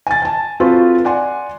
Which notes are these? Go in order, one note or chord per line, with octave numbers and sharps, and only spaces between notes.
G#5 A6
G#5 A5
C4 F4 F#4 A4 B4 C5
D5 F#5 G#5 C6